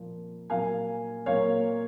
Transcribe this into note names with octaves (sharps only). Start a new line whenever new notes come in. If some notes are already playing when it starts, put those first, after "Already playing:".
Already playing: A#2 F3 A#3
A#2 F#3 A#3 F5 G#5
A#2 F#3 A#3 C#5 F5